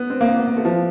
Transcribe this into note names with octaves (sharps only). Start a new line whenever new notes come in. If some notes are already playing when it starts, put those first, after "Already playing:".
Already playing: B3
C4
A#3
B3
B3
A#3
A3
F3